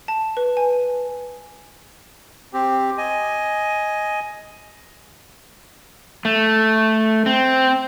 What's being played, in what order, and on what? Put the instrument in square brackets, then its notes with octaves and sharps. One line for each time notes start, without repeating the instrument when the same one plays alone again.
[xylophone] A5
B4
G#5
[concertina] C4 G4
D#5 G#5
[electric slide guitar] A3
C4